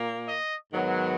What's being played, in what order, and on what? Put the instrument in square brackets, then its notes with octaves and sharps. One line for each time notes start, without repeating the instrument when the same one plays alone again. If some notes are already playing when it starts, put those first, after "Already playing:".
Already playing: [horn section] A#2 A#3
D#5
G#2 D#3 F#3 B3